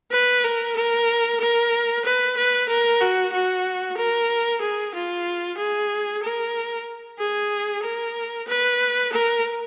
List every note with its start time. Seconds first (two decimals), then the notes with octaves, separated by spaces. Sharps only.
0.12 B4
0.44 A#4
0.76 A#4
1.40 A#4
2.05 B4
2.37 B4
2.69 A#4
3.01 F#4
3.33 F#4
3.98 A#4
4.62 G#4
4.94 F4
5.58 G#4
6.23 A#4
7.19 G#4
7.83 A#4
8.48 B4
9.12 A#4